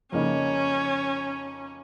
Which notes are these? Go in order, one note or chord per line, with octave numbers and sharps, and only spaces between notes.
F2 C#3 A#3 C#4 D#4